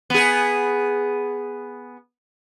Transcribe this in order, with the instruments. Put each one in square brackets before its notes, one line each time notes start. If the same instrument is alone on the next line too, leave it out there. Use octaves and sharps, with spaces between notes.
[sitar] B3 G#4